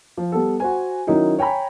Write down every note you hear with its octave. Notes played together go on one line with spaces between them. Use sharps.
F3
G3 B3 A4
F#4 C5 G#5
D#3 F#3 C#4 D#4 E4
C#5 G5 G#5 A#5 B5